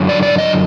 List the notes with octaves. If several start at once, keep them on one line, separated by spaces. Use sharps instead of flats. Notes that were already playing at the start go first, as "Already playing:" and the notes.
Already playing: F#2 D3 F#3
D5
D5
D#5